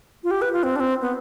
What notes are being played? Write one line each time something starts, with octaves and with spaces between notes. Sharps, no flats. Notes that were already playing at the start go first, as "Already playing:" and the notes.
F4
G4
B4
F4
C4
D4
C4
B3